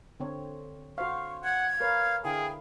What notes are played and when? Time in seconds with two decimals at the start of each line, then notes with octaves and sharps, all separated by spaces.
0.20 D3 C4 C#5
0.98 F#4 C5 F5 C#6
1.44 F#5 G#6
1.80 A#4 B4 C#5 F5
2.24 D3 E4 G#4 F5 G5